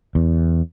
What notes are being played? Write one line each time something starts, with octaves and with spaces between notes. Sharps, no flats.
E2